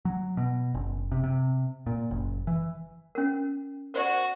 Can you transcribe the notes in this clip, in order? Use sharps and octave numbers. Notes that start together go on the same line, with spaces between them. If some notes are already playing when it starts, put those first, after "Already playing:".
F#3
B2
F#1
C3
C3
A#2
F#1
E3
C#4 A#4
F#4 A#4 C5 D5